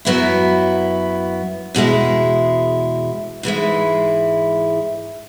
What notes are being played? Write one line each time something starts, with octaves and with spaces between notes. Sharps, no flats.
F#2 F#3 B3 E4
E2 B2 G#3 E4
G#2 E3 G#3 E4